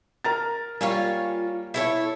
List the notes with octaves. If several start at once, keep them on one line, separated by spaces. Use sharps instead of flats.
A#4 A#5 A6
G3 A#3 F4 C#5 G#5
E4 A4 C#5